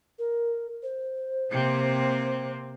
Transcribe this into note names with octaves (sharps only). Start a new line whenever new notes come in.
A#4
C5
C3 A#3 C4